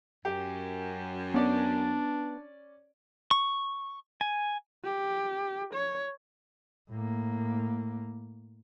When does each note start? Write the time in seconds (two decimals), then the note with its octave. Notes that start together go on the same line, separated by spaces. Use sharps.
0.25 F#2 G4
1.34 B3 C#4 D4 D5
3.31 C#6
4.21 G#5
4.85 G4
5.74 C#5
6.90 A2 A#3